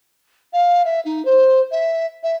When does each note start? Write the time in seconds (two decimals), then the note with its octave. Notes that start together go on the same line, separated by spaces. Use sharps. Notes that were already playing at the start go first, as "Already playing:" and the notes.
0.53 F5
0.85 E5
1.05 D#4
1.25 C5
1.71 E5
2.23 E5